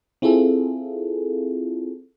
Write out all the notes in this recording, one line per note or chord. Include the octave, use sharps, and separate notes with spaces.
C4 E4 F4 G#4 A4